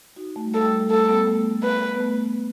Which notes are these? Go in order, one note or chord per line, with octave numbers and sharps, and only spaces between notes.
D#4 F#4
A3
G3
A3 A4
G3
A3
G3
A3 A4
G3 B3
A3
B4
B3
A3